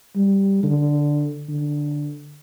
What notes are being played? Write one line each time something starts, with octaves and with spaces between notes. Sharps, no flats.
G3
D3
D3